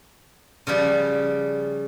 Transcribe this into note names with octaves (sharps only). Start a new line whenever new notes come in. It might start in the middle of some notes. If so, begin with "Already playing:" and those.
C#3 F3 G3